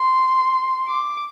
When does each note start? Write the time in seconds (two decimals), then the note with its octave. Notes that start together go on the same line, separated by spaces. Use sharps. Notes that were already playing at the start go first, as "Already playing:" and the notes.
Already playing: C6
0.88 D6